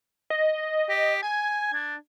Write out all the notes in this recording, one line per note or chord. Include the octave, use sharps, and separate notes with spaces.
D#5
G4
G#5 G#6
D4